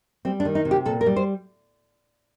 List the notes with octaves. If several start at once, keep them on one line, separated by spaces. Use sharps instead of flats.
G3 C4
D4
D#3
D#4
C3
G4
A#2 A4
A#4
G3
C5